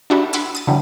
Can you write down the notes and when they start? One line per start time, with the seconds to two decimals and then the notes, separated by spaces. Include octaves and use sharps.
0.10 D4 E4 F#4 G4 A4 B4
0.33 B4 F#5 C6 D6 E6 G#6
0.55 D#6 A6
0.67 D3 E3 F#3 G3